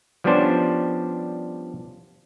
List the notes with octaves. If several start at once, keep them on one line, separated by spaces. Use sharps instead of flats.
F3 G3 B3 C#4 D4 C5